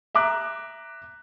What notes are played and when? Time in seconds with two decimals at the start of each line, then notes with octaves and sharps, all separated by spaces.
0.15 E5 A#5 D6 F#6